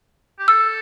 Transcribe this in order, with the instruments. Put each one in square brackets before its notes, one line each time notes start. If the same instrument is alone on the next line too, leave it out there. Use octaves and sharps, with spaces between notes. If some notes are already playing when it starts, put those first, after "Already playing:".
[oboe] G4
[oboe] A4 [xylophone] E6